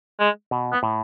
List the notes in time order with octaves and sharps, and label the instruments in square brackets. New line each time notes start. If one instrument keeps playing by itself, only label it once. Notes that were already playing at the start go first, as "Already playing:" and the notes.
[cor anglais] G#3
[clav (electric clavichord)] B2
[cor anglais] B3
[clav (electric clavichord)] A2